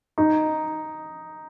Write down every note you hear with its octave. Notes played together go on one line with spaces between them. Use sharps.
D#4